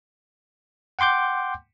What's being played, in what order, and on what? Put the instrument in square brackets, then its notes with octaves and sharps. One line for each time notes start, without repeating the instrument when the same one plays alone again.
[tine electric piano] F#5 G5 C6 D6 G6